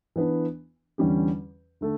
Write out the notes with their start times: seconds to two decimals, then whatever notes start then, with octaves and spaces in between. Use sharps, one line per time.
0.16 E3 B3 D4
0.98 E2 D3 G3 C#4 G4
1.81 D3 A3